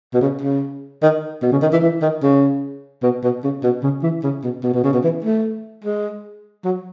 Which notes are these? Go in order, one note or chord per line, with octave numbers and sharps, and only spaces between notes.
B2
C#3
C#3
D#3
B2
C#3
D#3
E3
E3
D#3
C#3
B2
B2
C#3
B2
C#3
E3
C#3
B2
B2
B2
C#3
B2
E3
A3
G#3
F#3